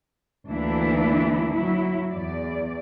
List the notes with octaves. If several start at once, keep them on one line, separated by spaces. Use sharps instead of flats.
D2 E3 A#3 D4 E4
F#3 E4
E2 D5